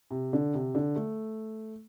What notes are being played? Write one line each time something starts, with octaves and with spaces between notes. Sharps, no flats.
C3
D3
C3
D3
A3